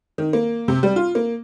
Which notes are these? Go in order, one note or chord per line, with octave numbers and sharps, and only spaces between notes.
D#3
A#3
C3
G3
F4
A#3